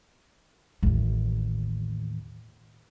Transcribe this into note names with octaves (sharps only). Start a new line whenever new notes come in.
A1 D#2